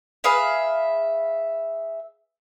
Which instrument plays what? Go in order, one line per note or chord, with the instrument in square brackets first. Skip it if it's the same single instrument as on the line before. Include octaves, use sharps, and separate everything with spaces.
[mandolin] G#4 B4 E5 F5